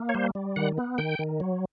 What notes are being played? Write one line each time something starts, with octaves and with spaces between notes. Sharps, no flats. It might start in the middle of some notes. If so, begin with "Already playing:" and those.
Already playing: A#3
C#5
G3 C5
G3
D#3 F#5
B3
D#3 G5
D#3
F#3